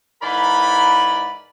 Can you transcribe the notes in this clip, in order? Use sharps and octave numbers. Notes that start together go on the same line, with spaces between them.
G#2 E3 A#4 D5 B5